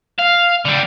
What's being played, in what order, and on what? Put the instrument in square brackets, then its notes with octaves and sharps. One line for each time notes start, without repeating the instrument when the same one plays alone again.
[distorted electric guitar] F5
D3 G3